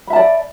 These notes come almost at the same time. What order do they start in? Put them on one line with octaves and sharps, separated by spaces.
B5 E5 A5 D5